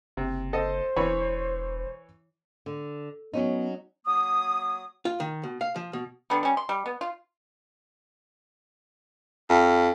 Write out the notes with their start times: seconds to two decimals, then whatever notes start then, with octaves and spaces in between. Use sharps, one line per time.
0.17 F#1 C3
0.53 A4 C5 D#5
0.96 E1 E3 C#5 B5
2.66 D3
3.33 F#3 B3 C#4 D#4
4.06 F#3 A#3 D#6
5.05 F4
5.20 D#3
5.43 B2
5.61 F5
5.76 F3
5.93 B2
6.30 D3 G3 B3
6.43 G3 C#4
6.57 C6
6.69 G3
6.86 B3
7.01 F4
9.50 F2